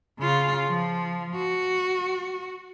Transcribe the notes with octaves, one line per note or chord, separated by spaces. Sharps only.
C#3 F4
F3
F#4